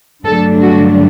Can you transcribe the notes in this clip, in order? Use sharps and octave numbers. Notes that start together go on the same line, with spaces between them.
G2 D3 F#3 A3 D4 A4
F#4